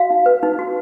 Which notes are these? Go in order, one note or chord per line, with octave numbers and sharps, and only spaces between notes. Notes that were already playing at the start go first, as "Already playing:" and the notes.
Already playing: F#4 F5
D#4
B4
D#4
F#4